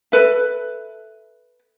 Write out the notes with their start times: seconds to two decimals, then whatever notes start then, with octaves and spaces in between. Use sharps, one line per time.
0.12 A4 B4 E5